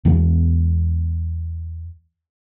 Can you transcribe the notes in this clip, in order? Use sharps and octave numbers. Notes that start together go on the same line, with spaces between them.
E2 E3 G#3